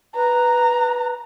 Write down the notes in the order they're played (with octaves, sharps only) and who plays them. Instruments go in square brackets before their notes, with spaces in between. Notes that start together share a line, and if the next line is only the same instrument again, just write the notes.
[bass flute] B4 [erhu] A#5